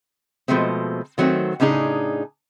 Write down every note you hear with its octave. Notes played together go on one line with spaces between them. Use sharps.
B2 F3 G#3 A3 C4
D#3 F#3 A3 C4
A2 C#3 D4 D#4 G#4